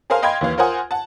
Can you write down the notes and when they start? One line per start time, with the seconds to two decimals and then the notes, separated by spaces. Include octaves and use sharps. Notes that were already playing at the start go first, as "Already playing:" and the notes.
0.10 G#4 A#4 C5 F5 G#5
0.22 D#5 F5 G5 B5 C6 G#6
0.41 D#2 E3 F5
0.58 F4 A#4 C5 F#5 G#5 D#6
0.91 F#5 A5